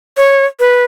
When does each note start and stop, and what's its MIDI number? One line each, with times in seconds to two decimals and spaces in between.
0.17 0.45 73
0.60 0.84 71